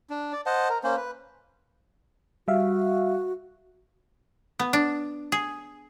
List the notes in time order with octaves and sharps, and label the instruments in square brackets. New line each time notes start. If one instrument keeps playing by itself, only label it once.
[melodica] D4
D5
C5 D#5 F#5 A5
A#4
A#3 C#4 C5
B4
[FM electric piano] G3 E5 F5 [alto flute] F#4
[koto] B3
D4
G#4